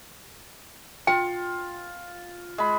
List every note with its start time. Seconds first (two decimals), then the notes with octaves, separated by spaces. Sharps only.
1.07 F4 G5
2.58 G#3 B5